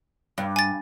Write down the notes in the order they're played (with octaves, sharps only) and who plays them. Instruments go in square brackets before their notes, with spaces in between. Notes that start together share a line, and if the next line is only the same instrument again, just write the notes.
[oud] G2
[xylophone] G#5 A6